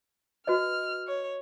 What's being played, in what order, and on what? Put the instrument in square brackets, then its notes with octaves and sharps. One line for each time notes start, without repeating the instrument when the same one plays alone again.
[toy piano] F#4 B4 D#5 [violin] F6
[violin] C#5